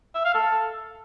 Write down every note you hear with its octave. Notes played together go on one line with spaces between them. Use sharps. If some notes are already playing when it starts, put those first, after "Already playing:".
E5
F5
A4